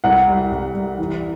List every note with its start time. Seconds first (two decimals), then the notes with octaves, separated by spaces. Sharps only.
0.04 C2 F#5
0.28 G3
0.52 C2
0.75 G3
0.98 E3